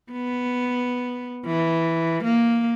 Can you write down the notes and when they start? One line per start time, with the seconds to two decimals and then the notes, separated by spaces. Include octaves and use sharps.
0.12 B3
1.46 E3
2.23 A#3